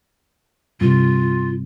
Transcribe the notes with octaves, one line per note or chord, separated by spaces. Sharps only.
G2 C3 F4